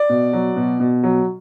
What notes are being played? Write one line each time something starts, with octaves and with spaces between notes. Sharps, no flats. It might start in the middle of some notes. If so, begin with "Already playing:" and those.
Already playing: D5
B2
F#3
B2
B2
F#3